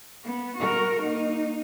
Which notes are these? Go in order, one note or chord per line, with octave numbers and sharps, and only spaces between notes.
B3
F#4 A#4
A#3 D#4